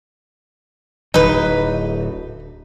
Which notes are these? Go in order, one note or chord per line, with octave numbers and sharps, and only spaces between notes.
D1 D3 F#3 D#4 B4